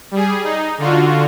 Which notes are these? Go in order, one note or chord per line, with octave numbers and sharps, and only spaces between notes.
G3 G#4
D#4
D3 F4 F#4